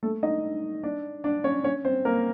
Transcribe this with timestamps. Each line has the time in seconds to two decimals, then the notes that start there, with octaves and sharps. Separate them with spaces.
0.03 A3 A4
0.23 D#4 D#5
0.83 D4 D5
1.24 D4 D5
1.44 C#4 C#5
1.64 C#4 C#5
1.85 C4 C5
2.05 A#3 A#4